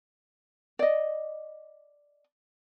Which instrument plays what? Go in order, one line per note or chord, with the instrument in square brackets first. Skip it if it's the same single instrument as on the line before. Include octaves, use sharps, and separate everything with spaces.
[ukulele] D5 D#5